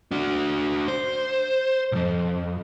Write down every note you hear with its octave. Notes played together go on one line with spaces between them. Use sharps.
D4 F#4
C5
B1 F2